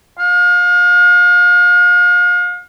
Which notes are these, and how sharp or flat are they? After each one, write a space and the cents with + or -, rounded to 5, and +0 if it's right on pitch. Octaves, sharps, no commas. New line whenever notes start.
F5 +40